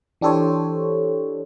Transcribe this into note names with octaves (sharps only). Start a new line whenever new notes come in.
E3 D4 G4 A4 C5 C#5